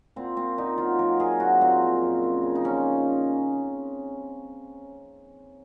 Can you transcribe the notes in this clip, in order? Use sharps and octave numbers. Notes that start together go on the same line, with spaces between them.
A#2 C4
A#2 C4
A#2 D#4
F#3 F4
F#3 A#4
A#2 G#4
A#2 F#4
A#2 C4
F3
F#2
C#3
C#3
D#4
F3 C#4